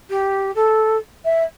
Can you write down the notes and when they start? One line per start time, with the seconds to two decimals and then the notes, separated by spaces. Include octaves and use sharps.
0.10 G4
0.55 A4
1.25 E5